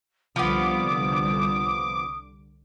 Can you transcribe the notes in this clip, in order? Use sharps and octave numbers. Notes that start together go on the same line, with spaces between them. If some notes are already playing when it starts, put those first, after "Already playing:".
C2 D3 F3 G3 B3 D6 D#6